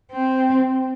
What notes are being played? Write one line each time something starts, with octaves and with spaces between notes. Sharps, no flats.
C4